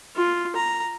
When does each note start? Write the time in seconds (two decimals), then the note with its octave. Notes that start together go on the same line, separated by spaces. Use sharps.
0.16 F4
0.56 A#5